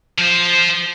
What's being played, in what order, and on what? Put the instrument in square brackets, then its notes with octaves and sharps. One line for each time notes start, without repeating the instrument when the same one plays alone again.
[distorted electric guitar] F3 C5